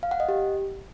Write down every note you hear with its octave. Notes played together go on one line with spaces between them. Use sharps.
F5
F#5
D#5
G4